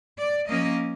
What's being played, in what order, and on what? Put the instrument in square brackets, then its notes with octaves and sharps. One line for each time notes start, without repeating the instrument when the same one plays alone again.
[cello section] D5
F3 A#3 C#4 D#5